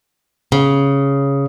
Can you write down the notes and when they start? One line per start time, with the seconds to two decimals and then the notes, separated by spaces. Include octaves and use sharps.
0.52 C#3